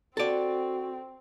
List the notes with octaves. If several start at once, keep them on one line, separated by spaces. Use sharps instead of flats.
C4 F#4 A4 D5